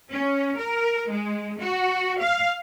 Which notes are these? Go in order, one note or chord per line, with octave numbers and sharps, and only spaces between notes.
C#4
A#4
G#3
F#4
F5